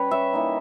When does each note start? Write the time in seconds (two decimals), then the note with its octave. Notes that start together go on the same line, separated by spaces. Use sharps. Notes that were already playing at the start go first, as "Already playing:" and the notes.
Already playing: G3 C#4 B4 C#5
0.11 E5
0.33 E3 A#3 D#4